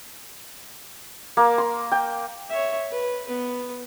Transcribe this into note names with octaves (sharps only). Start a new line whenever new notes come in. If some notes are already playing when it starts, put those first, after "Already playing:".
A#3
C6
G5
C#5 E5
B4
B3 B4